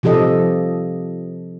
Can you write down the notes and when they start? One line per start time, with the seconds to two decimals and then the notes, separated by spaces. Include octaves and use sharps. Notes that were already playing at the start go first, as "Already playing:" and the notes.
0.03 C3 F3 G4 A4 D#5